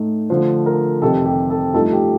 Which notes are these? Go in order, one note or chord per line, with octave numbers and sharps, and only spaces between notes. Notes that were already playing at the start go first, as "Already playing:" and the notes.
Already playing: A2 A3 D#4
D3 F3 A3 C5
A#4
F2 C3 D#3 A4
G4
A4
G2 F3 A3 D#4 A4
G4